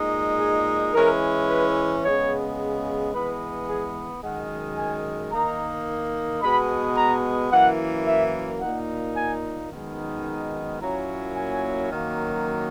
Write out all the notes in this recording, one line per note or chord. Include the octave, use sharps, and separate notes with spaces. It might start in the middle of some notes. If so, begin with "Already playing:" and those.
Already playing: A#2 G#3 D#4
G#4
E3 G#3 C#4 E4 A#4
B4
C#3 G#3 B3 C#5
E3 G#3 B3 B4
G#4
F#2 D#3 G#3 F#5
G#5
D#3 A#3 D#4 A#5
B2 G#3 B3 B5
A#5
F#2 E3 A#3 E4 F#5
E5
A#2 A#3 D#4 F#5
G#5
F#2 D#3 G#3 B3 D#4
A#2 F#3 A#3 C#4 E4 A#5
G#5
F#2 D#3 F#3 A#3